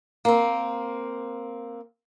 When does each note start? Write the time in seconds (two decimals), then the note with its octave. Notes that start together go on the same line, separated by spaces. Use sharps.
0.25 A#3 C4